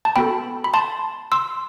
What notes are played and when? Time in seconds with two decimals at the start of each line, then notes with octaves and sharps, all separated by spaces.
0.05 A5
0.16 B3 F#4 A4 G5 B5
0.64 B5
0.74 A5 C6
1.32 C6 E6